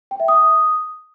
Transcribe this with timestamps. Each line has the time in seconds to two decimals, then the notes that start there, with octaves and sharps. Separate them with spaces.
0.11 G5
0.20 E5
0.28 D#6